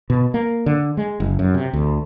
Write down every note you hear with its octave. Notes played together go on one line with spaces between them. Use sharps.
B2
A#3
D3
G#3
F#1
F#2
C3
D2